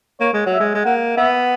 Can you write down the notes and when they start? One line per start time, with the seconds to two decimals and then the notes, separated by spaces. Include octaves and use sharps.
0.20 A#3 C#5
0.33 G#3
0.46 F#3
0.52 E5
0.60 G#3
0.75 G#3
0.84 A#3 F#5
1.17 B3 E5